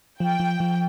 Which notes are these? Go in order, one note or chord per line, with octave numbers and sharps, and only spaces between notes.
F3 G5
F3
F3